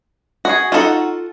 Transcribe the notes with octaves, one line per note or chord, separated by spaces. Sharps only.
F#4 G#4
D#4 F4 F#4 A4 F#5